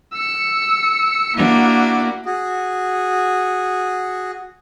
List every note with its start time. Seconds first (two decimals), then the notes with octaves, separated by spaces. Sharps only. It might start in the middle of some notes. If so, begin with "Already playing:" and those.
0.13 E6 C#7
1.37 A#3 D4 E4 F#4
2.25 F#4 G#4